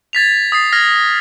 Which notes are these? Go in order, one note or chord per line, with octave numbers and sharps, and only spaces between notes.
G#6 A6 B6 F7
D#6 A6 C7
F6 G#6 A#6